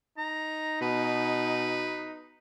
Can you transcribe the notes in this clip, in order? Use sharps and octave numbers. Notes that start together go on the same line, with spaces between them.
D#4 A#5
B2 B4